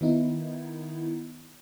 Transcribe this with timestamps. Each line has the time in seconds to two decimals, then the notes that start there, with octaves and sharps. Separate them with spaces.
0.01 D#3 B3 D#4 E4